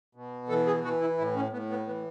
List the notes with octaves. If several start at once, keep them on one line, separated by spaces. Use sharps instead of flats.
B2
E3 A4
G#4
E3 F#4
E4
A2 E4
C#4
A2 B3
B3
E3 B3